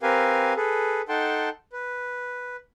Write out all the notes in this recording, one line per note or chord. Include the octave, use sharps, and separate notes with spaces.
C4 G4 A#4 B4 F5 G#5
G#4 A4 B4
D#4 A4 F#5 G5 A5 C6
B4